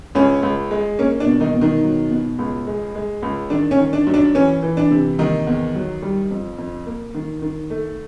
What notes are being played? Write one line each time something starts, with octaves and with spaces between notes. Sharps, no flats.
C#2 C#4
C#2
G#3
A#3 C#4
D4
B2
D#3 D#4
B2
D#3 D#4
F#3
B2
C#2
G#3
G#3
C#2
D#3 D4
C#4
D#3
D4
F#2
D4
E3 C#4
E3
D4
C3
D#3 A#3 D#4
E2
F#3
G3
F2
F2
A#3
D#3
D#3
A3